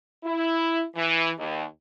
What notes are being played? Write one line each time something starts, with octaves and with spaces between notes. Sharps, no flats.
E4
E3
D#2